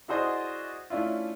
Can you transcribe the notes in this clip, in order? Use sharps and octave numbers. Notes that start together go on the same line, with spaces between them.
E4 F#4 G#4 C5 D5 D#5
A3 C#4 D4 E4 F4